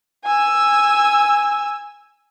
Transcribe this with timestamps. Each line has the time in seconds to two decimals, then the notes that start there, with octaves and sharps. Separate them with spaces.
0.25 G#5 E6